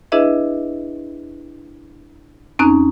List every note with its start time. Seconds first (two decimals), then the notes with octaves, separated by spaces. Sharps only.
0.12 D4 E4 G#4 B4 D#5 E5
2.59 F2 C4 C#4 D#4 A#5 F#6